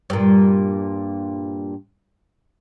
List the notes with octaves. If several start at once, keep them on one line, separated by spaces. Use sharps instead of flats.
G2 A#2